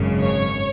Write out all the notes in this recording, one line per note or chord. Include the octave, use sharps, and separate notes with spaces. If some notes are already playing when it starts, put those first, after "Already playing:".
Already playing: G#1 F#2 C#3
C#5